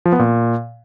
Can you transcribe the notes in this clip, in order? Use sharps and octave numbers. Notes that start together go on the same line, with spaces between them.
F3
B3
A#2